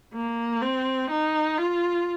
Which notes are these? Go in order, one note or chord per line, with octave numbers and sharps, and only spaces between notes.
A#3
C4
D#4
F4